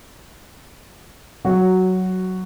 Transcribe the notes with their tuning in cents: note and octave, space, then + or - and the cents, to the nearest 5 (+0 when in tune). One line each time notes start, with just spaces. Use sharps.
F#3 +10 F#4 +0